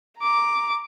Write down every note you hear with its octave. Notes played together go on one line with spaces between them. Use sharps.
A#5 D6